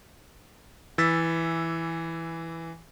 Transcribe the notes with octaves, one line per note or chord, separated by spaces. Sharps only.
E3 E6 A6 B6